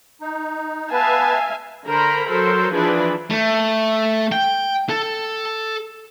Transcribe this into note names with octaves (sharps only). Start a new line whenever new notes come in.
D#4
B3 B4 E5 F5 G#5 A5
D3 A#4 C5 A#5 B5
F#3 A4 A#4 C5
E3 F3 D4 G#4 B4 D5
A3
G5
A4